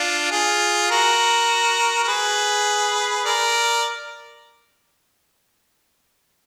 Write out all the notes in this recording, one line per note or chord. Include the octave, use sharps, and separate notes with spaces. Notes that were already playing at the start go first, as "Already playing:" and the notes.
Already playing: D4 F4
F4 G#4
F#4 A#4
A#4
G#4 B4
A#4 D5